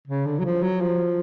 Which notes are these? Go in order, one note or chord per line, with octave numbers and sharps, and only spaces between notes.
C#3
D3
F#3
F3
F#3
F3